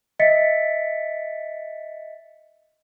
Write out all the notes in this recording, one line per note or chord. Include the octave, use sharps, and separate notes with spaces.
D#5 E5 A6 B6 C#7